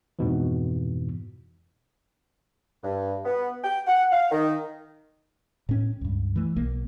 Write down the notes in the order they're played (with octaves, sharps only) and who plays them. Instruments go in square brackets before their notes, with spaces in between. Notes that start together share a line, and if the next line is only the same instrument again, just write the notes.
[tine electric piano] F2 G#2 B2 E3
[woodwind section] G2
B3
G5
F#5
F5
D#3
[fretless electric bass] A2 C#4
C#2 G2
E3 A3
B1 A#3